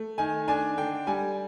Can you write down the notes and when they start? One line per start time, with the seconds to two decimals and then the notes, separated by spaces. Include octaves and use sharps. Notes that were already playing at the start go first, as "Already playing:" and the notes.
Already playing: A3
0.18 D#3 G#5
0.48 D4 G#5
0.77 D3 G5
1.07 G3 G#5